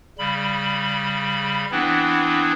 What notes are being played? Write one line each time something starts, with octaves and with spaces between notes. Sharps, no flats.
C#3 G3 B5
E3 B3 C4 D4 E4